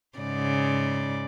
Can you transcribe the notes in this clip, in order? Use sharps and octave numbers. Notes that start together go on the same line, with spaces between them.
G#2 C#3 D5